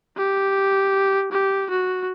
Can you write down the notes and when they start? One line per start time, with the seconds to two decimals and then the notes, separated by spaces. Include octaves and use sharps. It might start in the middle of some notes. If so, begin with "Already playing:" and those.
0.17 G4
1.32 G4
1.70 F#4